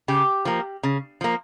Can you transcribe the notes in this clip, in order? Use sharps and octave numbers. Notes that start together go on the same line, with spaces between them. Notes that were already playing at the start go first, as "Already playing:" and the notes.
C#3 G4
F3 A#3
C#3
F3 A#3